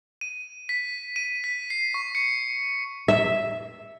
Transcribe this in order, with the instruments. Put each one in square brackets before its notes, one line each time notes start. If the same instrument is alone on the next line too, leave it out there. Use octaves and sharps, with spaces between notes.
[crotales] D#7
B6
D#7
B6
C7
C#6
C#7
[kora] E5